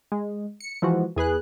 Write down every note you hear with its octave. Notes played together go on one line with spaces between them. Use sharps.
G#3
C#7
E3 F3 G#3 F#4
E2 G#4 B4 F#6